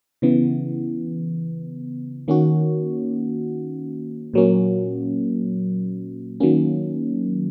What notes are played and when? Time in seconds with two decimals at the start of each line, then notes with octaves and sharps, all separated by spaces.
0.22 C#3 E3 B3
2.28 D#3 A#3 C#4 F#4
4.34 A#2 F#3 A#3 C#4
6.40 D#3 F#3 A#3 C#4